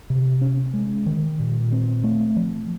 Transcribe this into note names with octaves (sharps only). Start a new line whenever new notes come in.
C3
C#4
G#3
D#3
A#2
C4
A3
F3